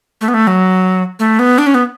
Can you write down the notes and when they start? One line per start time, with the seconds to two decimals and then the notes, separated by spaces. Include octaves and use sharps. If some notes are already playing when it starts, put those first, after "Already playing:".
0.21 A3
0.28 B3
0.34 A3
0.47 F#3
1.19 A3
1.39 B3
1.58 D4
1.67 C#4
1.74 B3